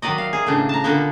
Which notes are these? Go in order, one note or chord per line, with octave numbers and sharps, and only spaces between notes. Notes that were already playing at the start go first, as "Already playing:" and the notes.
D#3 F#3 D5 D#5
F5
G#4
A2 C#3 D4
A5 A#5
A#2 D3 A#3 B3